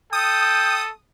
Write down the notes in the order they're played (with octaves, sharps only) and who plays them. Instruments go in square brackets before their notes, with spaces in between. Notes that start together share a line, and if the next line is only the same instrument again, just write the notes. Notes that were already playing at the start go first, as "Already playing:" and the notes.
[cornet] A4 [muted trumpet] G5 [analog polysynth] D#6